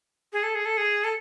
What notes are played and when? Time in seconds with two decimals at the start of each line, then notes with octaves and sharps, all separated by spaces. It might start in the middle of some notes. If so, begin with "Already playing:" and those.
0.33 G#4
0.43 A4
0.55 G#4
0.65 A4
0.77 G#4
1.04 A4